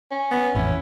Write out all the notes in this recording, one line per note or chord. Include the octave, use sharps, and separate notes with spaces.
C#4
B3
A1 F2 A2 C#4 E4